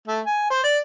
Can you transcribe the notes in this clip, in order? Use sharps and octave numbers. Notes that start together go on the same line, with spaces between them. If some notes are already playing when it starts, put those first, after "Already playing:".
A3
G#5
C5
D5